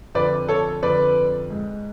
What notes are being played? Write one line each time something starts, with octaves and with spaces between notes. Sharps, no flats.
F2 D3 B4 D5
A4 C#5
F2 D3 B4 D5
G#2